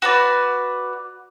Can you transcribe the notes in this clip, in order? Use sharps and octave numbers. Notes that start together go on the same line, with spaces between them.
F#4 B4 D5